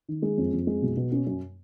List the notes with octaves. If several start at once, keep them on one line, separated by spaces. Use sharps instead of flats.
D#3
G#3
F2
F2
G#3
B1
B2
C#4
F#2